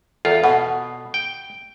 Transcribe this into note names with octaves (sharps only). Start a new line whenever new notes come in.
E2 F4 A4
B2 F#5
G5